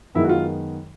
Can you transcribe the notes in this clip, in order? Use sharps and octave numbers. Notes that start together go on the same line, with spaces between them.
F#2 D#3 G#3 B3 E4
F#4
F4